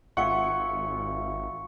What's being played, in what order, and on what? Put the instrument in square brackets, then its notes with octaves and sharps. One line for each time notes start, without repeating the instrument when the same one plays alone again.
[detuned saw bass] G#1 [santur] F4 E5 G#5 [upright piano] F#5 [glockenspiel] C#6 C#7